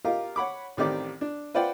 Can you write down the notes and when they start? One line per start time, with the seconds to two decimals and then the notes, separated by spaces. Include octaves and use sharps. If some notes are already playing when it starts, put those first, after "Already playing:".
0.05 F4 G4 A#4 D#5 F5
0.36 C#5 F#5 B5 D6
0.77 A1 D#3 C4 G4 D5 D6
1.21 D4
1.54 F4 B4 C5 D5 F#5 G5